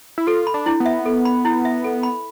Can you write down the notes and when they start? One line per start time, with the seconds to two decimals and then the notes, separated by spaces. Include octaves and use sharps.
0.18 E4
0.27 F4 A4
0.47 B5
0.54 D4
0.66 E4
0.80 B3
0.86 E5
1.06 A4
1.25 B5
1.45 E4
1.65 E5
1.84 A4
2.03 B5